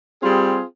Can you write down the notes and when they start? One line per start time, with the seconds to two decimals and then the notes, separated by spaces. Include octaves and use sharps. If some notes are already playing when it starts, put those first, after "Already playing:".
0.21 G3 C4 F4 G#4